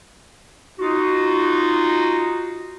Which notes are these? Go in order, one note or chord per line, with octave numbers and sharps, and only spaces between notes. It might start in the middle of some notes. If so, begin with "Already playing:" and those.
D#4 F4 F#4